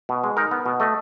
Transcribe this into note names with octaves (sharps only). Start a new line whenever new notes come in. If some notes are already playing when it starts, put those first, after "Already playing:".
B2
G#3
D#4 A#4
B3
B2
A3 D#5